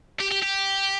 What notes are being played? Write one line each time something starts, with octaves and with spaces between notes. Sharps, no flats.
G4
G4
G4